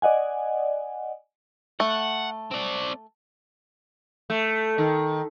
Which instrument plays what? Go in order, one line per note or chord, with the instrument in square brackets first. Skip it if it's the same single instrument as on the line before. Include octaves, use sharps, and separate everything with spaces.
[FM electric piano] D5 D#5 F#5 G#5
[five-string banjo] A3 [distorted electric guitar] F#5
[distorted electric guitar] C4 D5
[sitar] A3
D#3